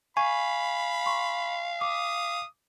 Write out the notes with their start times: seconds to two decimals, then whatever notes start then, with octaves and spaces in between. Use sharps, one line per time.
0.17 F5 G#5 B5 C#6
1.06 C6 C#6
1.81 D6 D#6